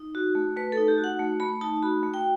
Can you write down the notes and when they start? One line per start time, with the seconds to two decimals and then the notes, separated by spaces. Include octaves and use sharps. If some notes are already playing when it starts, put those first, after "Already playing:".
Already playing: D#4
0.15 F#4
0.35 A3
0.56 A3 B4
0.72 A4
0.77 D#4
0.88 G4
0.98 F#4
1.04 F#5
1.19 A3
1.40 A3 B5
1.61 D#4 A5
1.82 F#4 B5
2.03 A3
2.14 G5